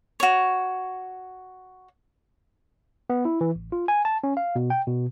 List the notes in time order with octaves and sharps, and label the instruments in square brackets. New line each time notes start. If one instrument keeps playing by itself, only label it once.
[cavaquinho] F#4 C#5
[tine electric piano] B3
E4
E3
A1
F4
G#5
A5
C#4
F5
B2
G5
B2